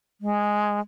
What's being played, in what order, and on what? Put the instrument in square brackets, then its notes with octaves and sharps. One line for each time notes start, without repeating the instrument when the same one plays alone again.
[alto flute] G#3